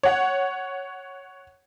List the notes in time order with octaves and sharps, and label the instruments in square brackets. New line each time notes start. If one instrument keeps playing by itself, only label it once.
[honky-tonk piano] C#5 F#5